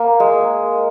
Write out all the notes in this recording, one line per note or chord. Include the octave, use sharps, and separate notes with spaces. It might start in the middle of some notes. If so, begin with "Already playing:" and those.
Already playing: A#3
G#3